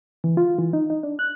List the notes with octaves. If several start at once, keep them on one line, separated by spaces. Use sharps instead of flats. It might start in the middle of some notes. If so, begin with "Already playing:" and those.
E3
F4
E3
D#4
D#4
D4
F#6